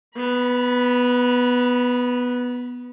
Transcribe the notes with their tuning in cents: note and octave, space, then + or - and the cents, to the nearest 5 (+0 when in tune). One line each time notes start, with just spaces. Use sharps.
B3 +0 B5 -40